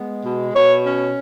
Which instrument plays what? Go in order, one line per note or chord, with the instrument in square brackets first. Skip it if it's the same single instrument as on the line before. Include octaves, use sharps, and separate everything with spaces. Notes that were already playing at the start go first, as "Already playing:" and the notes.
Already playing: [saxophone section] G#3 B3
B2
B2 C#5
C#4